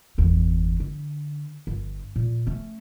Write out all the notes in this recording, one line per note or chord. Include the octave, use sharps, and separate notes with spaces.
G1 E2
D3
G1
A#2
A3 C#4